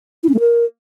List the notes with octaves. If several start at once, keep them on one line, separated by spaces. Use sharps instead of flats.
E4
C#4
A3
A#4